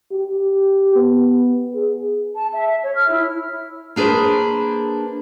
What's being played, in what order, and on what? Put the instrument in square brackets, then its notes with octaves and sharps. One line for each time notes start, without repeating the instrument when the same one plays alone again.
[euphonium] G4
B3
G#4
[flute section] A5
E5
C#5
F6
E4
[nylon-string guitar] A#3 D4 G#4 B4 C5